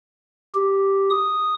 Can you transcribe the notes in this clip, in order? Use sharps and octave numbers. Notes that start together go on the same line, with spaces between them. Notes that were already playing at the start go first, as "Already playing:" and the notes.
G4
D#6